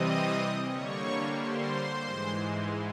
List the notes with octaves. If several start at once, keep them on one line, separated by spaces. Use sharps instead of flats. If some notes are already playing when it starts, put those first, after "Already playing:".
Already playing: C3 E3 G3 C4 D#5 D#6
D3 G3 A#3 C#5 C#6
C5 C6
G#2 E3 G#3